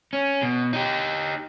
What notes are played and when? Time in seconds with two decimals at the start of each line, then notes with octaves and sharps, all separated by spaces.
0.13 C#4
0.42 B2
0.73 D#4 G4